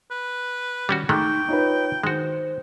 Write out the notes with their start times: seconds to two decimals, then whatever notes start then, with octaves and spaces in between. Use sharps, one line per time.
0.11 B4
0.89 D#3 G3 C#4 F#4
1.09 D#3 G#3 A3 D#4 G5 C#6 D6
1.48 D#4 F4 B4 C#5
2.04 D#3 G#3 F#4 C5